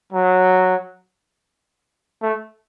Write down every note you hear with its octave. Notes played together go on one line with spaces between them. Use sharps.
F#3
A3